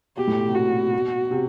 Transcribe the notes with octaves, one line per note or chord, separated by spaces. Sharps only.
B2 G4
A2
B2
C3
A#2 F#4
B2
C3